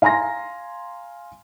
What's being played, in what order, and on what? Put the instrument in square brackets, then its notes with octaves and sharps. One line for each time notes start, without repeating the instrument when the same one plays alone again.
[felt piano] F5 G#5 A#5 C6 A#6